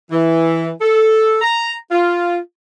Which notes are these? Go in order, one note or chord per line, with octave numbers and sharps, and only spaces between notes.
E3
A4
A#5
F4